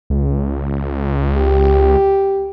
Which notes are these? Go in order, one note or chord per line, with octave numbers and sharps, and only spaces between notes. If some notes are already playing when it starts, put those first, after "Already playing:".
C#2
G4